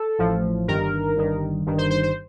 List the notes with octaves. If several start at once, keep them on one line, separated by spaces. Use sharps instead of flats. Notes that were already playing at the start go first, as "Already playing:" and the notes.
Already playing: A4
A1 A2 F3
G1 G2 D#3 A#4
G1 G2 D#3
G1 G2 D#3
C5
C5
C5